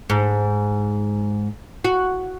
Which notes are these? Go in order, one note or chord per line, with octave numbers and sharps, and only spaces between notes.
G#2
F#4